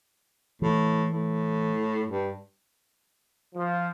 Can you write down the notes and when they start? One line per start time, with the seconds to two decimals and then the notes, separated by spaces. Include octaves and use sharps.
0.62 A2 E3
1.12 A2
2.07 G2
3.55 F3